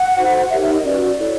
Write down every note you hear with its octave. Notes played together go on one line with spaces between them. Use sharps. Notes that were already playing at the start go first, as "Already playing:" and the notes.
Already playing: F#5
D#4 F#4 A4 C5
D#4 G4 A#4 C#5 E5
E5
D#5
C#4 F#4 B4 D5
E4 A4 C#5